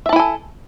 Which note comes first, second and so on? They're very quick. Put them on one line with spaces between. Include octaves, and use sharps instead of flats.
E5 A5 E4 G#5 A4